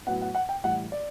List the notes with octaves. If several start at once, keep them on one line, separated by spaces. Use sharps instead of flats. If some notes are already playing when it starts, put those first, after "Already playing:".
A2 F#3 B3 F#5
F#5
F#5
G5
A2 E3 G3 F#5
D5